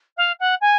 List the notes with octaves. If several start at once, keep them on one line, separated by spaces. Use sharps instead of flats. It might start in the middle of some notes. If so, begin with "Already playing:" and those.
F5
F#5
G#5